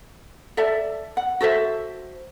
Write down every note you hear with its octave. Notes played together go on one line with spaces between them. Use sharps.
A4 D5 E5 A5
F#5
F#4 A4 C5 E5